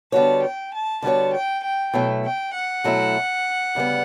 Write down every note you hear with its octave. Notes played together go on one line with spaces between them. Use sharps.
D3 G3 B3 F#4 C#5 A5
G5
A5
D3 G3 B3 F#4 C#5 A5
G5
G5
B2 F#3 A3 E4
G5
F#5
B2 F#3 A3 E4
D2 C#3 G3 B3